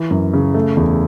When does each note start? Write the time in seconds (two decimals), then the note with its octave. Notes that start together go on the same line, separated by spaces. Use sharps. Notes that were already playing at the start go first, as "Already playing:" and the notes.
Already playing: E3
0.11 F#2
0.34 C#3
0.54 A3
0.77 E2